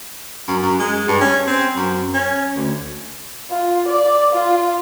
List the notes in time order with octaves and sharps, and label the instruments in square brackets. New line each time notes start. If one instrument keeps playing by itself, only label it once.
[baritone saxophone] F#2
F#2
G#3
G2
C#4
C4
F#2
C#4
D2
[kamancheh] F4
D5
F4